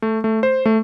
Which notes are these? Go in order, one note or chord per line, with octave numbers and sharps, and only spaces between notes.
A3
A3
C5
A3